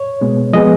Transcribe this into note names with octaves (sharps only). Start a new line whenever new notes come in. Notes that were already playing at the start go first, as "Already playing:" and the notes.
Already playing: C#5
B2 G#3 B3
F3 G#3 B3 D#5